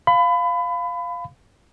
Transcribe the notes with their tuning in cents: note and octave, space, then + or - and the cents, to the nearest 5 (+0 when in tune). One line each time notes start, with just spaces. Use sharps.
F5 +0 B5 +25